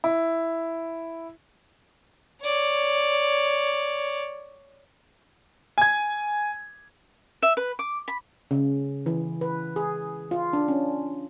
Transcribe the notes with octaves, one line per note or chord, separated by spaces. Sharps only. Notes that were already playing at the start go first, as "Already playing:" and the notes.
E4
C#5 D5
G#5 G#6
E5
B4
D6
B5
C#3
E3
B4
G#4
F4
D4
C#4